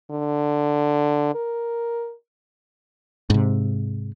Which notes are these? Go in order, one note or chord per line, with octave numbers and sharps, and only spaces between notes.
D3
A#4
G#2 C3